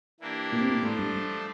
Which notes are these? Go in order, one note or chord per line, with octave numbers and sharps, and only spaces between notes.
E3 A#3 D4 G4 A#4
A#2
C3
A#2
A2 F3 A3 D4 A4 C5
G2
G2